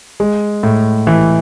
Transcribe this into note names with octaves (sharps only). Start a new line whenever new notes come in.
G#3
A2
E3